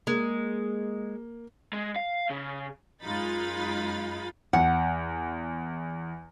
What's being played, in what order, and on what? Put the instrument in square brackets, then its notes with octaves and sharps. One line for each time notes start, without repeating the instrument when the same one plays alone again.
[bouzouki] G#3 [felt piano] A#3
[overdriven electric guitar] G#3
F5
C#3
[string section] F#2 G#3 D#4 F4 B5 A6
[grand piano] E2 [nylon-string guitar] F#5